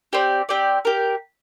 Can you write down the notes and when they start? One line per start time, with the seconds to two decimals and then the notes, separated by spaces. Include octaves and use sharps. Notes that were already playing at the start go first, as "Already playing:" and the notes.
0.13 C4 G4 D5
0.49 C4 G4 D5
0.85 G4 A#4